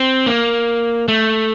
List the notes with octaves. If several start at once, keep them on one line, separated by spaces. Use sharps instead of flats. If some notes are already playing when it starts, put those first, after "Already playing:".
Already playing: C4
A#3
A3